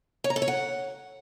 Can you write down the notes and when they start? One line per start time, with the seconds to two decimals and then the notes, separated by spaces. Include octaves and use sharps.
0.24 C#5
0.30 A#5
0.36 A4
0.42 C#5
0.48 F#5